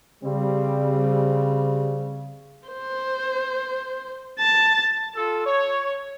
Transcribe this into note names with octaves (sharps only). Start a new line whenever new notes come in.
C#3 G3 C4
C5
A5
F4 A4
C#5